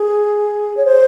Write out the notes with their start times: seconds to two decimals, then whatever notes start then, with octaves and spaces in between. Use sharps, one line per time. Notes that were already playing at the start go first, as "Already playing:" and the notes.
Already playing: G#4
0.77 C#5
0.85 C5